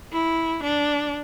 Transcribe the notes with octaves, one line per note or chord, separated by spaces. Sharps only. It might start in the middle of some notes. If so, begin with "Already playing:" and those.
E4
D4